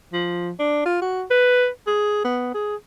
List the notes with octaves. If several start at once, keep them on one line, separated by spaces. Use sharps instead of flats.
F3
D4
F4
F#4
B4
G#4
B3
G#4